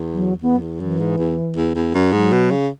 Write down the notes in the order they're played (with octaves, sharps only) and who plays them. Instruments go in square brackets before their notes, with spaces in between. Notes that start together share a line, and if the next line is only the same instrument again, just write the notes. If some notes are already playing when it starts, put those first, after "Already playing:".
Already playing: [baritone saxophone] E2
[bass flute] F#3
[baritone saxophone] E2 [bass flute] B3
[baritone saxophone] F#2
E2
[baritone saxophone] F#2 [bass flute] E3
[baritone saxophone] G#2
E2
E2
E2
F#2
[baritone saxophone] G#2 [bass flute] F#3
[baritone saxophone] B2
C#3